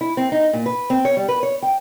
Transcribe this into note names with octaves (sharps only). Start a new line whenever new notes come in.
E4
C4
D#4
A#2
B4
C4
C#5
G3
B4
C#5
G5